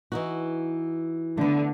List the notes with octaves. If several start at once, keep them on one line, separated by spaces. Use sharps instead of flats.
E3 D#4 F#4
D3 A3 B3